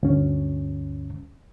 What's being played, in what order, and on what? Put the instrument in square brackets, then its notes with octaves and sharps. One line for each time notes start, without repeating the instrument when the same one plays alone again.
[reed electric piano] D2 G2 C#4